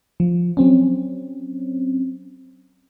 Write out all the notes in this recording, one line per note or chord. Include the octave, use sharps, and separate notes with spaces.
F3
F#3 C4 C#4